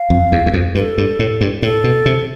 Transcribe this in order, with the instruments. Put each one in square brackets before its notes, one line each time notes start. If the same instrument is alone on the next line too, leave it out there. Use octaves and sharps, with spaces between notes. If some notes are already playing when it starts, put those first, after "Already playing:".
Already playing: [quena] F5
[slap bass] F2
E2
E2
F2
[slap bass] G2 [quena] B4
[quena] A4
[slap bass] G2
A2
G2
[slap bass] A2 [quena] A4
[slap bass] B2
C3